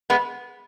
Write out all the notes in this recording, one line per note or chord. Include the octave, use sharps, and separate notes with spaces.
G#3 B3